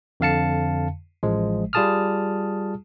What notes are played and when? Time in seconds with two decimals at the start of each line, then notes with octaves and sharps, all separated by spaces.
0.20 F2 D3 F5 A5 C#7
1.23 A1 F3 G#3
1.73 G3 F4 G#4 A5 D#6 F6